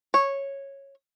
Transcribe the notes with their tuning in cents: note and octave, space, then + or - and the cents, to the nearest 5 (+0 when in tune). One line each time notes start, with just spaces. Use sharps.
C#5 -10